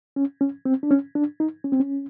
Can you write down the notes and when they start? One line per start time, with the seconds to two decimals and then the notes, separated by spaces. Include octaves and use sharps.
0.16 C#4
0.41 C#4
0.65 C4
0.83 D4
0.91 C#4
1.15 D4
1.40 D#4
1.64 C#4
1.72 C4
1.80 C#4